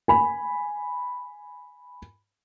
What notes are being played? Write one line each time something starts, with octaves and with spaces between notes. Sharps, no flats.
G#5 B5